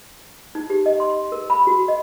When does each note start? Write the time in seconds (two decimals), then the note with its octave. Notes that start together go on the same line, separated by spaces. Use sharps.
0.55 D#4
0.70 G4
0.86 D#5
1.00 C6
1.32 A#4
1.50 B5
1.67 F#4
1.88 D#5